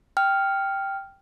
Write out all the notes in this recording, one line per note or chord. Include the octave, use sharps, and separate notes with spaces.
G5 F6